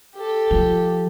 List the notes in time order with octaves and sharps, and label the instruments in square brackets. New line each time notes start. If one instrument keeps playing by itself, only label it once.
[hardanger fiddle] G4 A4
[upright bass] F3